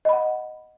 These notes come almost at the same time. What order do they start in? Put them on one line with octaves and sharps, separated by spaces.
D#5 B5 F#5